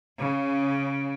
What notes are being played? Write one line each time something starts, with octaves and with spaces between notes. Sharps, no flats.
C#3